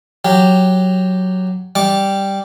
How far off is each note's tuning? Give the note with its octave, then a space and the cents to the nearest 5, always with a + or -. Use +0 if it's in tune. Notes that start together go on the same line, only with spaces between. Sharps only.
F#3 +0 G4 +0
G3 +0 D6 -10